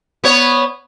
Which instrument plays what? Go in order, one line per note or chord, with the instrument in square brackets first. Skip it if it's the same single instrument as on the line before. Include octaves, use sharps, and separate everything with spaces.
[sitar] B3 C#5